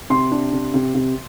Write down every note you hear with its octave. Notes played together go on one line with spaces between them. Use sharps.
C3 C6
D4
C3
C3
C3